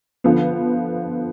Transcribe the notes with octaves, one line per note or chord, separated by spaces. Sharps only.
D3 F3 B3